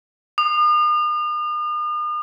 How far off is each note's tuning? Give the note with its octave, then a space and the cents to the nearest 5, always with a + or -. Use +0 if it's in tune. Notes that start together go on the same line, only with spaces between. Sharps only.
D#6 -40